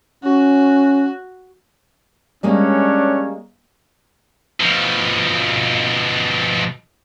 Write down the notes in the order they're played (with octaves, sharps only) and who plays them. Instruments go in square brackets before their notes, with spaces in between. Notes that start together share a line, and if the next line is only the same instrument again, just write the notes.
[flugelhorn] C#4 [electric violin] F#4
[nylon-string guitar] G3 G#3 A#3 [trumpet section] C#4 D4 C#5
[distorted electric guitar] B2 F3